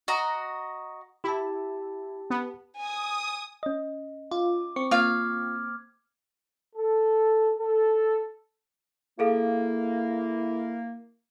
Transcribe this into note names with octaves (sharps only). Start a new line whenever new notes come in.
F#4 D#5 A#5
E4 G4 A5
B3
G#5 D#6
C#4 D#5
F4 D6
C4 C#6
A#3 F4 F5 D6 F6 G#6
A4
A4
A#3 E4 G#4 A4 F5